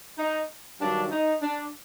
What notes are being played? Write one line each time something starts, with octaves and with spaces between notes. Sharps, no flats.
D#4
G2 D#3 F#3 D4
D#4
D4